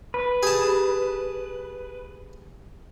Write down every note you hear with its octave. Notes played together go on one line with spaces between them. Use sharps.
B4
G4 G#4 A5